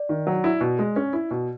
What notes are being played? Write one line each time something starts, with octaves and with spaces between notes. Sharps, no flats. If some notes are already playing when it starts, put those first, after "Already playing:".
Already playing: D5
D#3
F#3
E4
B2
G#3
C#4
E4
B2